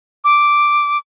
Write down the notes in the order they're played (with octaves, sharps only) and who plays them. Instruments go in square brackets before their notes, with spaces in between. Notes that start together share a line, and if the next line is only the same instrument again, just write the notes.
[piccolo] D6